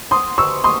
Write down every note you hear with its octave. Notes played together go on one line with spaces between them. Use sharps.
C6 D#6
C#6 E6
C6 D#6